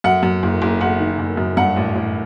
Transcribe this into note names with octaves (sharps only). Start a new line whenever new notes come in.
F#2 F#5
F#2
F#1
F#1
F#1 F#5
D#3
F#1
F#2
G2 F#5
A1
A1